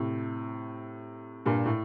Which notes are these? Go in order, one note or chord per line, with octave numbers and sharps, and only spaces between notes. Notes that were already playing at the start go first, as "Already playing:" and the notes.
Already playing: A2 C3
G2 A#2
A2